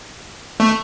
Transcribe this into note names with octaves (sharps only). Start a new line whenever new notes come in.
A3